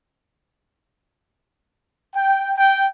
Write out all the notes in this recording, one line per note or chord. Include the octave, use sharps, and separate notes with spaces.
G5
G5